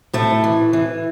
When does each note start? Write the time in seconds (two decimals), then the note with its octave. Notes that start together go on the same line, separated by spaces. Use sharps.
0.13 A2 A3
0.44 E3
0.73 E3